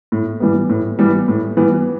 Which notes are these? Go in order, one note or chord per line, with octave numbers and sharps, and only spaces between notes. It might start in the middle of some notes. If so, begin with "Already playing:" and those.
A2
E3 G3 B3
A2
E3 G3 B3
A2
E3 G3 B3